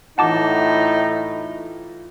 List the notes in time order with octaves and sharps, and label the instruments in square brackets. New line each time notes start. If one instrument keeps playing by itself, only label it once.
[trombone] A2 [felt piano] E3 F4 [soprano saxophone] D#4 [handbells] F#5 A5 D6